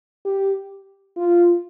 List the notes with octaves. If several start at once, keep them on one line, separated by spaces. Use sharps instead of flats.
G4
F4